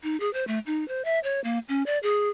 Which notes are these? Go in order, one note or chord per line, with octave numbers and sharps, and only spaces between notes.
D#4
G#4
C5
A3
D#4
C5
E5
C#5
A#3
C#4
D5
G#4